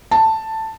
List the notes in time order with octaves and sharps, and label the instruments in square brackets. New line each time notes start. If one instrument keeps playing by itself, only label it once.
[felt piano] A5